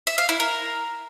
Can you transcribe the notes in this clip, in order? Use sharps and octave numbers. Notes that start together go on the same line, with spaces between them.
E5
F5
E4
A#4